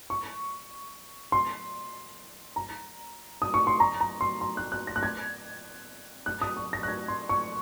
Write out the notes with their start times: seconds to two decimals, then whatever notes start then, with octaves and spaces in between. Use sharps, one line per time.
0.10 C#6
1.32 C6
2.56 A#5
3.42 D#6
3.54 C#6
3.67 C6
3.80 A#5
4.01 A#5
4.21 C6
4.41 C6
4.57 F#6
4.72 F#6
4.87 A#6
4.96 F#6
5.03 G#6
6.26 F#6
6.41 D#6
6.57 C#6
6.73 A#6
6.83 F#6
6.88 G#6
7.08 C6
7.29 C#6